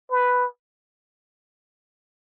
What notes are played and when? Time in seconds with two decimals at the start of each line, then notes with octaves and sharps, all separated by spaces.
0.11 B4